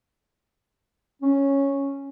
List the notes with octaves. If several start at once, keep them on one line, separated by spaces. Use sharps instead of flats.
C#4